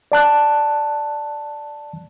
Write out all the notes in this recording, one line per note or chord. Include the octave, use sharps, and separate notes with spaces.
D5 A5 F#6